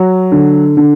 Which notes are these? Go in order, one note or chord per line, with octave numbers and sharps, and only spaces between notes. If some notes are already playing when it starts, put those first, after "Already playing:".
Already playing: F#3
D3
D3